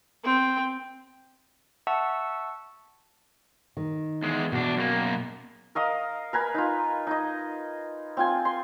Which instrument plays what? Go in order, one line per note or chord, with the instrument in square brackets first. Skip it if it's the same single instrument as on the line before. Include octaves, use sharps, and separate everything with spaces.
[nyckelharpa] C4 G5
[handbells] E5 F#5 A5 C#6 E6
[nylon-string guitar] D#3
[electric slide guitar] E2 G#3
[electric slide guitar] E2 D4 [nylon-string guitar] B2
[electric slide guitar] F#2 A#3
[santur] A#4 D#5 F5 D#6
A#4 B4 G#5 B5
D#4 F4
D#4 D#5
C4 F4 G#5
C6